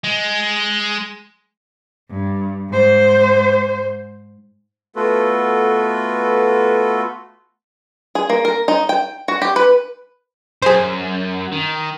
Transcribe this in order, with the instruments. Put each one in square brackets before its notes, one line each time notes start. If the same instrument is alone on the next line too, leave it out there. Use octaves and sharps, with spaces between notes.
[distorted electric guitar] G#3
[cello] G2
G#2 C5
[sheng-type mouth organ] A3 B3 F4 F#4 A4 B4
[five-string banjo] G#4
A#3
A#4
D#4
G5
F#4
G4
B4
[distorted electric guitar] F#2 [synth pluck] G#4 C5
[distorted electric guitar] D#3